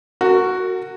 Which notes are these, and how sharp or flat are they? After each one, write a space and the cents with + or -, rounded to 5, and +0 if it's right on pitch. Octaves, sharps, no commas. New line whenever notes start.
F#4 +0 A#4 -35